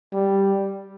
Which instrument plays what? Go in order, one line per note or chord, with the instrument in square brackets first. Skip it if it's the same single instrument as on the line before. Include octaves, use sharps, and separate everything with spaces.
[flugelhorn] G3